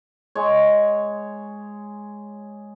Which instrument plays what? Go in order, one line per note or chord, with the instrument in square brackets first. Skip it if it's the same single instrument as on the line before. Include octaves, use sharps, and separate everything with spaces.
[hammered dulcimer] G#3 C#5